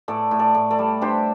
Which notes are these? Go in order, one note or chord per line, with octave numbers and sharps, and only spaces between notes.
A2 A4 D5
A2
A4 D5
A2
A4 D5
G3
D4 G4 C5